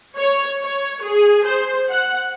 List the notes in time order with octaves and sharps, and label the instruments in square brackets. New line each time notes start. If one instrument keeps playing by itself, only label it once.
[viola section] C#5
C#5
G#4
C5
F#5